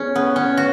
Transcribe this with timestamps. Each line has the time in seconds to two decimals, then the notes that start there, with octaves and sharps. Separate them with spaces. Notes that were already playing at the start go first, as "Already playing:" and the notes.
Already playing: E2 C#4 G#4
0.15 B3
0.36 C#4
0.57 F#4